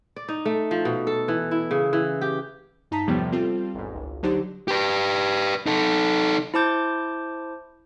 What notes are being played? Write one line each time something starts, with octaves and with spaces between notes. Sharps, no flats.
D5
D#4
A3
F3
B2
A4
E3
E4
C#3
E3
G4
G2 D#4 A5 A#5 B6
E2 A2 C3 F3 G3 B3
G3 C4 F4 A4
A1 E2 G#2
G#1 C#2
D3 F#3 D4 D#4 G4 C5
G4 B4
D#4 A4
E4 C5 A5 D6 G6